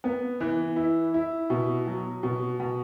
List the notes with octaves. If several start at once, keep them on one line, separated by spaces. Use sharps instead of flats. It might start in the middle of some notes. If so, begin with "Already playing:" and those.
B3
E3
E4
E4
B2
F#3
B2
B2